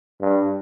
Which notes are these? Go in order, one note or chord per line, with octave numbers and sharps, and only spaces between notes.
G2